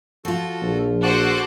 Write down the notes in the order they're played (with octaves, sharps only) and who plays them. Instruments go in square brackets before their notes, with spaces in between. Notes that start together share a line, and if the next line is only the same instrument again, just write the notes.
[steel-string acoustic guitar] F3 F4 [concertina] F#4 A4
[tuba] A#1
[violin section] F#4 A4 C5 [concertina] A5 D6 F#6